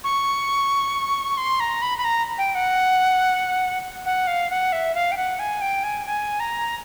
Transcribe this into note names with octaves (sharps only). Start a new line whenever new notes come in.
C#6
C6
A#5
B5
B5
A#5
G5
F#5
F#5
F5
F#5
E5
F5
G5
F#5
G#5
G5
G#5
G#5
A#5